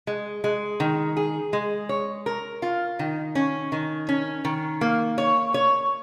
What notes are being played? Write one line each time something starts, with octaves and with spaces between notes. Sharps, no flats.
G#3
G#3
D#3
G#4
G#3
C#5
A#4
F4
D#3
C#4
D#3
C#4
D#3
A#3
C#5
C#5